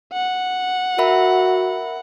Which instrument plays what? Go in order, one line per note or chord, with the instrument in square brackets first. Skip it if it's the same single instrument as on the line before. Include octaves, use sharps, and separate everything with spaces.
[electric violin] F#5
[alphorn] F#4 [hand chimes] A#4 E5 B5